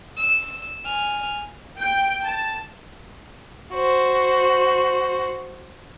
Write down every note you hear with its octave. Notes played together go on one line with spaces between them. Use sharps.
E6
G#5 F6
G5
A5
F#4 C5